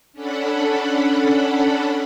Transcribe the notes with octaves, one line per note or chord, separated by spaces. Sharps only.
C#4 D4 A4 F#5 B5